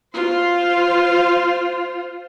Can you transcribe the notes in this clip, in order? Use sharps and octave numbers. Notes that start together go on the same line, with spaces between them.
F4 C5